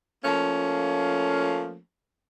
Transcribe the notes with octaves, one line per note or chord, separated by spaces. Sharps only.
F3 A3 A#3 C#4